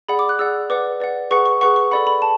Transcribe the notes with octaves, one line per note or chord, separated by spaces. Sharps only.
G#4 D5 F#5 B5
D6
F#6
G#4 D5 F#5 E6
B4 D5 F#5 D6
B4 D5 F#5
G#4 B4 F#5 C#6
C#6
G#4 B4 F#5 C#6
C#6
A4 D5 F#5 B5
B5
A5